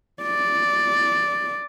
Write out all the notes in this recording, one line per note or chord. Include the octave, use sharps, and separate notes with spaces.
D5